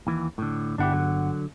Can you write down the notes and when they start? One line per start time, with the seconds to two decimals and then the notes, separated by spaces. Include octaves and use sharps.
0.07 D#2 E3
0.38 A2 D3
0.78 G1 D4 E4 G4 F#5
0.92 D3 F#3